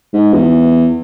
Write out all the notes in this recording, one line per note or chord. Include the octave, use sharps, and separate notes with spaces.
G#2
E2